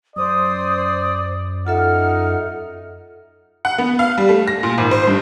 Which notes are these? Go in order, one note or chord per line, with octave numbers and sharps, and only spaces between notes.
F#2 C5 D5 D#6
D#4 F4 A4 E5 F#5 F6
F#5
B3
F5
G3
A3
A#6
A#2
G#1
C5
G2